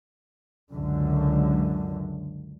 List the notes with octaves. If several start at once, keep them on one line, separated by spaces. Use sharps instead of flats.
C#2 F#2 D3